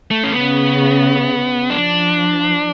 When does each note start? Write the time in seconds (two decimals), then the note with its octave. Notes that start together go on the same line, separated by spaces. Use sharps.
0.11 A3
0.24 C#4
0.33 C#3 B3
1.70 F3 D4